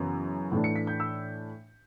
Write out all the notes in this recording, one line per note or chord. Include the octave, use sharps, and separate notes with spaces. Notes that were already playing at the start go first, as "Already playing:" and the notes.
Already playing: F#2 C#3 E3 B3
A2 E3 A3 D4
C#7
B6
G6
E6